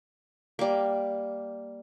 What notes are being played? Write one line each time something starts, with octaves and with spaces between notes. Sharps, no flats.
G3 A#3